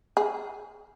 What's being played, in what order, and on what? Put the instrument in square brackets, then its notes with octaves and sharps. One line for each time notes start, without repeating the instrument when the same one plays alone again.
[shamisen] G#4